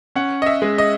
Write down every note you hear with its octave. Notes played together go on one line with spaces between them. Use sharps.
C#4 F#5
D#5
E5
G#3
D#5